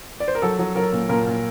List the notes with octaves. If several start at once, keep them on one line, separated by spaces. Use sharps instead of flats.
D5
C5
A#4
F#3 A4
F#3
F#3 A#4
A#2
A#2 A#4
A#2